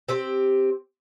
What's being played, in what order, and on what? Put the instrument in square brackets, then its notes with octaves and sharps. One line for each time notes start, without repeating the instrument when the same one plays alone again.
[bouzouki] C4 G4 C5